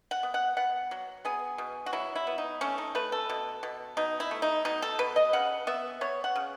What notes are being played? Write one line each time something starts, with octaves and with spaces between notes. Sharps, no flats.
F#5
B3
F#5
B3 F#5
F#3
B3 G#4
B2
F#4
F#3 E4
E4
B3
D#4
A3 C#4
D#4
A3 B4
A4
B2
B2
B2 D#4
E4
A3
D#4
B2 D#4
A4
B2 B4
D#5
C#3 F#5
B3 E5
B3 C#5
F#5
C#3